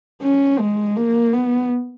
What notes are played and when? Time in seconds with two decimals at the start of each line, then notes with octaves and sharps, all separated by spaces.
0.22 C#4
0.59 G#3
0.96 A#3
1.33 B3